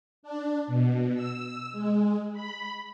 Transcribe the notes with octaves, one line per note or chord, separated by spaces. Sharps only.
D4
B2
E6
G#3
B5